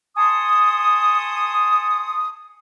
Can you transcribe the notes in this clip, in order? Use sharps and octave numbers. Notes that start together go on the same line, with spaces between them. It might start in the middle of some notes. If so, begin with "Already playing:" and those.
G#5 A5 C6 C#6 D#6